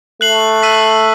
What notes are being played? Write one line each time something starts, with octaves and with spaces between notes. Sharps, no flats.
A3 F#6 C7 F#7
E6 B6 D#7